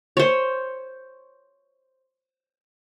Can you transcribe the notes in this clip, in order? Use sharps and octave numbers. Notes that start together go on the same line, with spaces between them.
C5 C#5